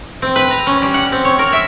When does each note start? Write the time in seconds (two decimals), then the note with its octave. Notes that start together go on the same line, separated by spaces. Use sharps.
0.22 C4
0.36 B4
0.51 A#5
0.67 C#4
0.82 G3
0.94 F#5
1.12 C4
1.25 C#5
1.39 A#4
1.53 E5